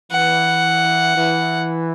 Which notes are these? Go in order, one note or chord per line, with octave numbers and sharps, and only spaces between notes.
E3 F#5
E3